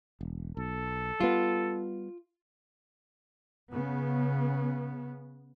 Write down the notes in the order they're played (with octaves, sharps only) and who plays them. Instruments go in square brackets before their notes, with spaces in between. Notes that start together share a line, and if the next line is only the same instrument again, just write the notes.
[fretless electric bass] E1
[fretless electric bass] B1 [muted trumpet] A4
[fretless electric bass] G3 B3 [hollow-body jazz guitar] F4
[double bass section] C#3 B3